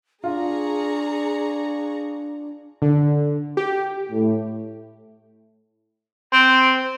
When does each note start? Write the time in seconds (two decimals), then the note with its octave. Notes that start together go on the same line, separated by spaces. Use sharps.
0.24 D4 F4 G#4 A#5 C#6
2.82 D3
3.57 G4
4.10 A2
6.33 C4